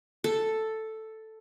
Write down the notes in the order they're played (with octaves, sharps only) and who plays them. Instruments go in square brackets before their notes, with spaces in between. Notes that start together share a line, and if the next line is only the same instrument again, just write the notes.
[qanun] A4